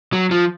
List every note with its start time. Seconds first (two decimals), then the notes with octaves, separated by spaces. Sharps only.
0.13 F#3
0.31 F3